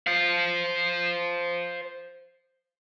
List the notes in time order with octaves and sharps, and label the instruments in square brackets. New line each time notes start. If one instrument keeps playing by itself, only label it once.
[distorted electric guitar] C5 F5